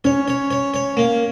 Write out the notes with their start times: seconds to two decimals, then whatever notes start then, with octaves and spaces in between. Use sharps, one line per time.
0.04 C#4 C#5
0.28 C#5
0.51 C#5
0.74 C#5
0.97 A#3